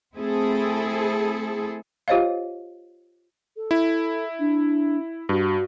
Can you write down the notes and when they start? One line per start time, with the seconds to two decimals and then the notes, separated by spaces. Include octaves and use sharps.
0.16 A3 C4 E4 G#4 A4
2.08 F4 G4 C5 C#5 D#5 F5
3.56 A4
3.71 E4
4.39 D4
5.29 G2 F#4